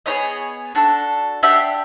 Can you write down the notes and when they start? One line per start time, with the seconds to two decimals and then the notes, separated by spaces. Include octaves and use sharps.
0.06 B3 D#4 G#4 C#5 D#5
0.75 D4 F#4 A4
1.43 D4 G4 E5 F#5